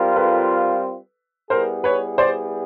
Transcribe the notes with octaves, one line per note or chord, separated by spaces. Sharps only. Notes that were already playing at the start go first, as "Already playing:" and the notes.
Already playing: G3 C4 F4 A#4
A4 B4
G3 B3 E4 G#4 A#4 C5
B4 C#5
C5 D5